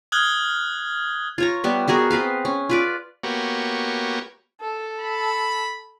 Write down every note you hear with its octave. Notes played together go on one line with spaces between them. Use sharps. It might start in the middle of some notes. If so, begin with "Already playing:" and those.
D#6 F6 F#6 G#6 F#7 G7
F4 C#5 A#5
G3 B3 E5
B3 F#4 G#4 A#4
B3 C4 B4 F5
C#4
F4 B4 D5
A#3 B3 F#4 G4 C#5
A4
B5